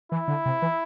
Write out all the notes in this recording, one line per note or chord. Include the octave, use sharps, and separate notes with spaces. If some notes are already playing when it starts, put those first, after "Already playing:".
E3 E4
D3
C3
E3